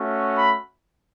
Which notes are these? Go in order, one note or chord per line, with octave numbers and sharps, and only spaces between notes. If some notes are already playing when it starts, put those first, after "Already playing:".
Already playing: A3 C#4 F#4
B5